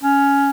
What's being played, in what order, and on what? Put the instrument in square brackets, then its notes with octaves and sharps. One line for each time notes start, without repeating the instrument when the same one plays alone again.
[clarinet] C#4